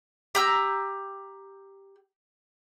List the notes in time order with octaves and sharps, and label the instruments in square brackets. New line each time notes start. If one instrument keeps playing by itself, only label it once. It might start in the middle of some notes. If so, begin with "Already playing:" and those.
[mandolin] G4 A#5 E6